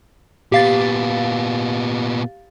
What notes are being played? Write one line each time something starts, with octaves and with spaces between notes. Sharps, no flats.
A#2 B3 G4 F5 A6